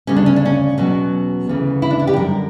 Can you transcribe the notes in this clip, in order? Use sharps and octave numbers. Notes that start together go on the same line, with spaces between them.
D2 C#3 G3 C#4
D4
C#4
D4
C#4
E2 B2 F#3 B3 C#4
D2 C#3 E3
E4
D4
E4
G4
F#2 D3 G3 A#4